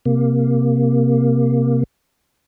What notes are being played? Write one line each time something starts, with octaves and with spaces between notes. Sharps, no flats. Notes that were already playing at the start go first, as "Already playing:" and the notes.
C3 A#3